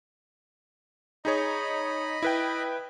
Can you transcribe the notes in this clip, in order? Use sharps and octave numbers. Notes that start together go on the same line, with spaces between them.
D#4 G#4 C#5 D#5 B5
E4 B4 G5